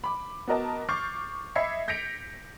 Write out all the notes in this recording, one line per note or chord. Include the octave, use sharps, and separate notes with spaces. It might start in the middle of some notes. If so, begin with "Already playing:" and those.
B5 D6
B3 F#4 A#4 D#5 A5
C#6 D6 F6 G6 A6 C7
D#5 E5 B5 G#6 C7 C#7
G6 A#6 B6 C#7 D7 F7